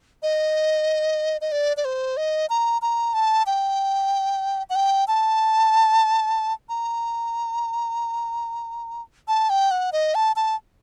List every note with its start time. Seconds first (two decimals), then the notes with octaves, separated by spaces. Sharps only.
0.23 D#5
1.41 D#5
1.52 D5
1.77 D5
1.85 C5
2.17 D#5
2.50 A#5
2.82 A#5
3.14 A5
3.46 G5
4.70 F#5
4.75 G5
5.08 A5
6.69 A#5
9.28 A5
9.50 G5
9.71 F#5
9.93 D#5
10.15 A5
10.36 A5